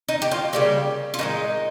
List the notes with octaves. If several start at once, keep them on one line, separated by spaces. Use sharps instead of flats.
D#4
G4
F4
C#3 G3 A#3 G4
F4
A#2 F3 G#3 D#4